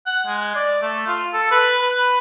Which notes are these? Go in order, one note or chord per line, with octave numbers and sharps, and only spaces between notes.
F#5
G#3
D5
A3
F4
A4
B4
B4